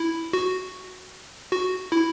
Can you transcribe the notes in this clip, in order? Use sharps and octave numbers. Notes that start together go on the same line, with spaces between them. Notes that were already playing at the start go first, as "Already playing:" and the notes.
Already playing: E4
F#4
F#4
E4